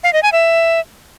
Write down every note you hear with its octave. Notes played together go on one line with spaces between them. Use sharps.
F5
D#5
G#5
E5